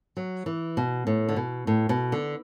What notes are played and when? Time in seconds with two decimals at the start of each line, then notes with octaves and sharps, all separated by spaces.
0.17 F#3
0.46 E3
0.77 B2
1.07 A2
1.29 D3
1.36 B2
1.67 A2
1.89 B2
2.12 D3